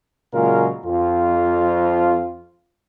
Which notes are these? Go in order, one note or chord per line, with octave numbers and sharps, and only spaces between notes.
A#2 C#3 F#3 G#3 F4 A#4
F2 F4